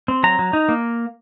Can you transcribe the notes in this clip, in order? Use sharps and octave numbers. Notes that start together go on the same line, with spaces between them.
C4
F#3 A#5
F#3
D#4
A#3